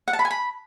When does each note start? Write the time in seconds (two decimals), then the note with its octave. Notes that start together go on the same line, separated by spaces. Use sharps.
0.08 F#5
0.13 A5
0.19 B5
0.25 G#5
0.31 B5